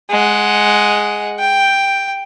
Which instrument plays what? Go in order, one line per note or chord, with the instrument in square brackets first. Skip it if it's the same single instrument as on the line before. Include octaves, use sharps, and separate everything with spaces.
[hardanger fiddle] G#3 F#5
G5